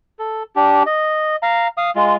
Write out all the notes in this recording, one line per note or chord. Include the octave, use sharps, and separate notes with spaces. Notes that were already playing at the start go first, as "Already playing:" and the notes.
A4
D4 G4
D#5
F5 A#5
F5 D#6
G#3 F4